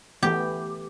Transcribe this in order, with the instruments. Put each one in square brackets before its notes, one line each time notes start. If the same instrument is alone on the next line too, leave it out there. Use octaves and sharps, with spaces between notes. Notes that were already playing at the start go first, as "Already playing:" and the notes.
[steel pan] E3 A3 B3 [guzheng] G4